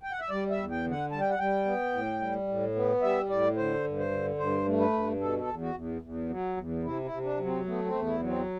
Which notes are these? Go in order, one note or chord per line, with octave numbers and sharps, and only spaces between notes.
G5
F#5
E5
G3 D5
E5
E2
G5
D3
F#5
G3 A5
G5
F#5
G3 G5
B3
A2
G3
A2
B3
G3 E5
A2 D5
D3 C5
G2
C5
D3
G2 C5
A3
B4
G2
B2 A4
A4
E2
F#4
E2
E2
F#3
E2
C3 E4
E4
C3
D4
F#3
C4
A3 B3
C4
E2
E4
F#3
C4